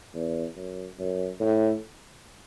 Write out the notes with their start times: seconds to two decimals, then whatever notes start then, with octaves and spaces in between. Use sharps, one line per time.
0.15 E2
0.56 F#2
0.99 F#2
1.40 A2